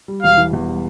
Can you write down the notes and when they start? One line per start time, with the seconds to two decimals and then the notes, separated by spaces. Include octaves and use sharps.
0.08 G3
0.22 E1 F5
0.38 E3
0.53 E2
0.68 G3